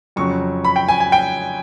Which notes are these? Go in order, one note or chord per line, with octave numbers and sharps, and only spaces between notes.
F2 C#3 F#3 C#6
B5
G5
G#5
G#5
G5